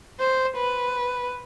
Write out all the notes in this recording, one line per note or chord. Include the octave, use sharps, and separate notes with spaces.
C5
B4